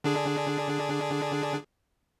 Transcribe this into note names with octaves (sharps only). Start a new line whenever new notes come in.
D3 D4 G#4